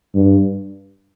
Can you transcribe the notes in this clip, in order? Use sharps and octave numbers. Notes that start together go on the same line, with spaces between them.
G2